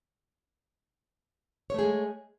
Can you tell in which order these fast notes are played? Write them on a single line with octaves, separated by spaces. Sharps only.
C#5 A3 G#4 G#3